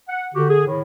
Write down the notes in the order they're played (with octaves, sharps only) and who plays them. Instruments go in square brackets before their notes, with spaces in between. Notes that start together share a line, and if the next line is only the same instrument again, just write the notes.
[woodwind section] F#5
[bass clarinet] D3 [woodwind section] F#4 G4
[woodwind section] G#4
A2 D#3